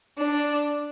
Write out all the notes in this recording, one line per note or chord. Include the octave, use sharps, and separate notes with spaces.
D4